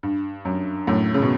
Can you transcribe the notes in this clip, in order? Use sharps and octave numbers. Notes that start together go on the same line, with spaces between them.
G2
F#2
F#2 A2
C#3
B2